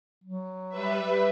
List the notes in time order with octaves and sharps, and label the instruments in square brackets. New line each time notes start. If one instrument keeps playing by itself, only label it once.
[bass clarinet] F#3
[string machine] G3 B4 E5